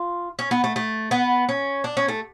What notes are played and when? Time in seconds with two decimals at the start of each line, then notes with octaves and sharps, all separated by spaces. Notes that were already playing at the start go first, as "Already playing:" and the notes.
Already playing: F4
0.39 C#4
0.51 B3
0.64 A3
0.76 A3
1.11 B3
1.49 C#4
1.84 D4
1.97 C#4
2.08 A3